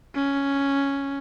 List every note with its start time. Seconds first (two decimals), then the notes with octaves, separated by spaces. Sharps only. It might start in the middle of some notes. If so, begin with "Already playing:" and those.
0.15 C#4